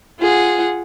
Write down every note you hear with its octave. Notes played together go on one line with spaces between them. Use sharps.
F4 G#4 F#5